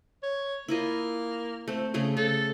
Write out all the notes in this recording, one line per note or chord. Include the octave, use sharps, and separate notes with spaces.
C#5
A#3 E4 F4 D#5
A3 C4
C#3 A3 G#4
C#3 A4